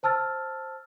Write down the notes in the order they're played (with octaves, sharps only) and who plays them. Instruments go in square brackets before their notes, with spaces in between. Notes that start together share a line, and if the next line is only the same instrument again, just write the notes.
[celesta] C5 A5 E6 F6 A6